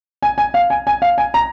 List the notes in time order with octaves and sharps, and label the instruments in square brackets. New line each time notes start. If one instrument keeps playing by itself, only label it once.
[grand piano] G#5
G#5
F5
G#5
G#5
F5
G#5
A#5